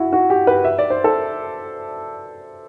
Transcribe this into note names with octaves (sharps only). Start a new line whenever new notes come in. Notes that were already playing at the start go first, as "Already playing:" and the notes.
Already playing: E4 F#4
F#4
G4
B4
E5
D5
C5
A4